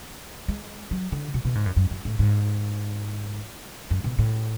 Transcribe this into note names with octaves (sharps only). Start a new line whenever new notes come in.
G#3
F#3
D3
B2
B2
G#2
F#2
F#2
F#2
A2
G#2
F#2
B2
A2